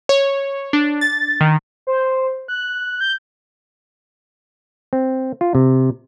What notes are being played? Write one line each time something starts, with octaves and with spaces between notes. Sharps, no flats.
C#5
D4
A6
D#3
C5
F#6
G6
C4
F4
C3